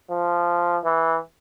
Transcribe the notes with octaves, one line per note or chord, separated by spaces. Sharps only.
F3
E3